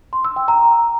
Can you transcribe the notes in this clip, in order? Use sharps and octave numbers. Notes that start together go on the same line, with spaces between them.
C6
E6
G5
A#5